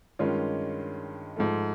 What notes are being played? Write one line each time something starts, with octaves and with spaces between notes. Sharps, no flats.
G2 D#3 G#3 C#4 F4
G#2 F3 A3